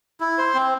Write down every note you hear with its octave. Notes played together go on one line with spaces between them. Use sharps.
E4
C5
C4